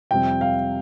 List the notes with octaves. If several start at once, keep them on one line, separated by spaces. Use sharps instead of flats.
F2 C3 G3 C4 G5
F5